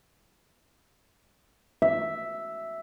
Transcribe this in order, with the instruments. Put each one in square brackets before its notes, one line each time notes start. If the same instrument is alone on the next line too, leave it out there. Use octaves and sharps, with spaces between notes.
[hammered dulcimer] E5